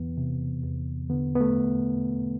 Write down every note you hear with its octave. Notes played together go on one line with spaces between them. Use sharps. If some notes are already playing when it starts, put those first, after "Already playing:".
Already playing: E2 E3 B3
C3
E2
D3 B3
B3
A3